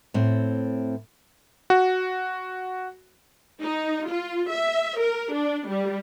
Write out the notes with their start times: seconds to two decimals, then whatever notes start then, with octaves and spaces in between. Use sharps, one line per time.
0.14 A2 C4
1.70 F#4
3.62 D#4
4.08 F4
4.51 E5
4.99 A#4
5.32 D4
5.69 G3